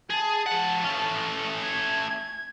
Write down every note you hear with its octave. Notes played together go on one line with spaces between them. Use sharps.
G#4 A5
F3 F#5
A3 C#4
G#6